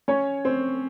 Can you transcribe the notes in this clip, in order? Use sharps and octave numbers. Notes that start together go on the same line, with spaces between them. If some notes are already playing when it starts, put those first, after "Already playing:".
C#4 C#5
C4 C5